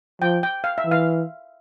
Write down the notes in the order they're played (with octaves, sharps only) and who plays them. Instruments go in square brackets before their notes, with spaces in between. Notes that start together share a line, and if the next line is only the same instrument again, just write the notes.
[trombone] F3 [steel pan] G5
[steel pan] G5
F5
E5
[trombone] E3
[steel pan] F5